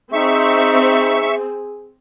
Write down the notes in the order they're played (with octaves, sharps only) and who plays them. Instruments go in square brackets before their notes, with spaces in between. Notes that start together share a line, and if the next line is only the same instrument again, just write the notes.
[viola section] C4 [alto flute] D#4 [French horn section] G#4 [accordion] E5 C#6